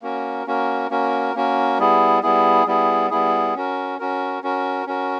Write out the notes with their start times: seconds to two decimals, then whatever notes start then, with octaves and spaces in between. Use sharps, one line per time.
0.02 A#3 C#4 F#4 A#4
0.47 A#3 C#4 F#4 A#4
0.90 A#3 C#4 F#4 A#4
1.34 A#3 C#4 F#4 A#4
1.78 G3 B3 E4 G#4
2.23 G3 B3 E4 G#4
2.66 G3 B3 E4 G#4
3.10 G3 B3 E4 G#4
3.55 C#4 F#4 A#4
3.99 C#4 F#4 A#4
4.43 C#4 F#4 A#4
4.86 C#4 F#4 A#4